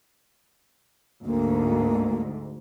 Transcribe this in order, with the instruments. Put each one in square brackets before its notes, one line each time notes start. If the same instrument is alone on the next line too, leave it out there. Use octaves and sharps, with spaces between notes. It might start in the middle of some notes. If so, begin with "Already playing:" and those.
[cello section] D2 G#2 [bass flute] A#3